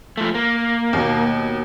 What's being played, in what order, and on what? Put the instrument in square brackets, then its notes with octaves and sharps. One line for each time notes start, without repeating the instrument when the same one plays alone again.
[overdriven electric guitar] F3 A3
A#3
[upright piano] D#2 B2